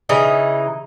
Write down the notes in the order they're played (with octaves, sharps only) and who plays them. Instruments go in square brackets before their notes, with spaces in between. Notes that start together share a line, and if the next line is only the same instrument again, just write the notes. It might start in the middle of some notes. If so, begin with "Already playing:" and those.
[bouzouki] C#3 E3 D#4